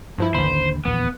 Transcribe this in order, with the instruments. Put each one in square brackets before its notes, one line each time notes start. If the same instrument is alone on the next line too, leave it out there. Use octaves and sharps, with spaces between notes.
[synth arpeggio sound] G2 F3 E4
[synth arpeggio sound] A1 B5 [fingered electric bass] D#2 D3 [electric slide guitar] C5
[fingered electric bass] D#1 A#1 E2 [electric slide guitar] B3